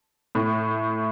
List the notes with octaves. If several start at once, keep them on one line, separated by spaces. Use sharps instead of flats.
A2